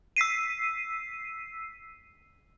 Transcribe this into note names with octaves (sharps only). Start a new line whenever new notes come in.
E6 B6 C7 D#7